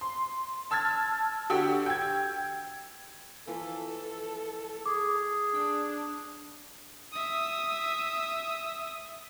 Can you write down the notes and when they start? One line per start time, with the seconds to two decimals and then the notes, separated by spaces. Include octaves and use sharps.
0.01 C6
0.71 A5 E6 F6 G#6 A6
1.50 D3 F#4 G4 E6
1.86 G5 G#6
3.47 E3 F3 E4 A4
4.86 G#4 D6
5.54 D4 G5
7.13 E5 D#6